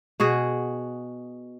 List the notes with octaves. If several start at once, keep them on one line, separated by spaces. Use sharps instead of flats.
B2 F#4 G#4